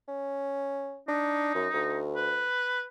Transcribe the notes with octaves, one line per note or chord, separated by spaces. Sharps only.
C#4
D4 D#4
F#2
D2
B4